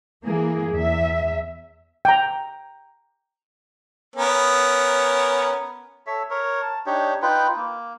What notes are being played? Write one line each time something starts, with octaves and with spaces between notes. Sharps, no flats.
E3 A#3 G#4
E2 E5
G5 A#5
B3 C#4 A#4
A4 C#5 E5
A#4 C#5
A5
D4 D#4 G4 C#5
D#4 F4 B4 G5
A#3